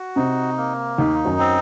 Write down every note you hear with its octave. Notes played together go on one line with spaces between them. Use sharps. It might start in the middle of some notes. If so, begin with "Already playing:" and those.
Already playing: F#4
C3 C4 D#4
A#3
D#2 D#3 D#4
F#2 F#3
C4